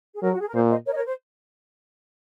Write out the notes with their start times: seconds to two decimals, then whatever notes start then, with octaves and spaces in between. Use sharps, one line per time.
0.15 G#4
0.22 F#3 A#4
0.33 F#4
0.40 G#4
0.48 A#4
0.54 A#2 C5
0.70 C5 D#5
0.86 A#4 C#5
0.92 D#5
0.96 A#4 C#5
1.06 C5